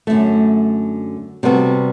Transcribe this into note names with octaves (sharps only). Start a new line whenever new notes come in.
F#2 D3 A3
C3 G3 B3 F#4 A4